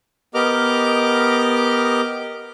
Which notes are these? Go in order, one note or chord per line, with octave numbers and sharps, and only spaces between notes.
B3 G4 A#4 D#5 D6 F6